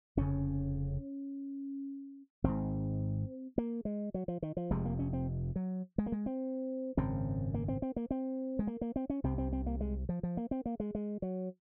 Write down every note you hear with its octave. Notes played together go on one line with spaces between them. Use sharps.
F1 F2 C#3 C#4
G#1 G#2 C4
A#3
G#3
F#3
F3
D#3
F3
F1 F2 C3 G#3
A#3
C#4
C4
F#3
G#3
A#3
G#3
C4
G#1 F#2 C#3 C4
A#3
C4
C4
A#3
C4
G#3
A#3
A#3
C4
C#4
C2 C3 C4
C4
C4
A#3
G#3
F3
F3
A#3
C4
A#3
G#3
G#3
F#3